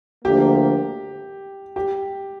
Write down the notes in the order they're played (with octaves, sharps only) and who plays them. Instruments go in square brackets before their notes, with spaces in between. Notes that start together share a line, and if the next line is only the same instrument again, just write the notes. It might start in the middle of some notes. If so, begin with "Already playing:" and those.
[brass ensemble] D2 D3 F3 A#3 [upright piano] G4
[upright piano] G4